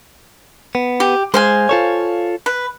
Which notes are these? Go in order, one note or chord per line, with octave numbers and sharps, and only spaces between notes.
B3
G4
G#3 C5 F5 G#5
F4 A4 C#5
B4